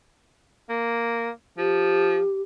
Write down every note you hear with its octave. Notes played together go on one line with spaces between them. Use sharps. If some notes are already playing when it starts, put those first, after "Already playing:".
A#3
F3 G4